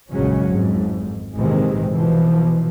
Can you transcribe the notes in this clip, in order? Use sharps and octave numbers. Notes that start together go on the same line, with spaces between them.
A#1 F#2 C#3 F#3 G#3 C#4
G#1 F2 G#2
A#1 G#2 C3 D#3 E3 G#3
B1 B2 E3 F3